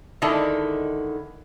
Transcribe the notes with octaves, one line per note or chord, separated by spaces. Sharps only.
D3 D#3 G#3 E4 A5